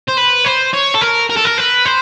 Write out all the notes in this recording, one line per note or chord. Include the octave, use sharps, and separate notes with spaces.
C5
B4
C5
C#5
A4
A#4
A#4
A4
A#4
B4
C5